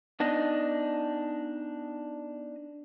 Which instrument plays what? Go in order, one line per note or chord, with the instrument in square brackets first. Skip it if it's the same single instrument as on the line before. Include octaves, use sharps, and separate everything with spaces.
[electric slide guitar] B3 D4 D#4 D#5